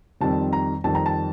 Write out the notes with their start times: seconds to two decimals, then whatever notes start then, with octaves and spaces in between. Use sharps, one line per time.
0.21 F2 D#3 G3 C4 A5
0.53 A#5
0.84 F2 D#3 G3 C4 A5
0.95 A#5
1.06 A5